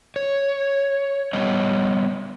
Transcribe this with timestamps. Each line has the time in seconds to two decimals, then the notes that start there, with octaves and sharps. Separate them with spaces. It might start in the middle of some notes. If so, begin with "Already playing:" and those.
0.16 C#5
1.33 G3 B3 C5 C#5 D#5